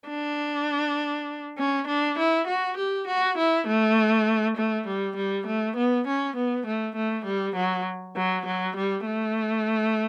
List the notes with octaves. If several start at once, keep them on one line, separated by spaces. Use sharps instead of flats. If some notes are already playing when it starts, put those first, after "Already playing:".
D4
C#4
D4
E4
F#4
G4
F#4
E4
A3
A3
G3
G3
A3
B3
C#4
B3
A3
A3
G3
F#3
F#3
F#3
G3
A3